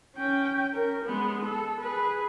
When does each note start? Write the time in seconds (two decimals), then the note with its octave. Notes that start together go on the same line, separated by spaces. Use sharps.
0.16 C#4 G5
0.72 C#4 A#4
1.05 G#3 B3
1.45 A4
1.81 G#4 B4